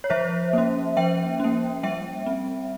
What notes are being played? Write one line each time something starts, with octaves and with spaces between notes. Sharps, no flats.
C#5
F3 C5 E5
A#3 C#4
F3 E5 G5
A#3 C#4
G3 E5 G5
C4